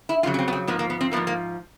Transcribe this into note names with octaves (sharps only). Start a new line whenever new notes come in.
E4
F2 C#3 F#3 F4
C#4
C4
B3
C4
G#2 F3 A#3 B3
A#3
B3
C4
G#2 F3 A#3 B3
A#3